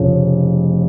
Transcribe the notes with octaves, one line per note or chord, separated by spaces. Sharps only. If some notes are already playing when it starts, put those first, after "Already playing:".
Already playing: F1 F2 C#3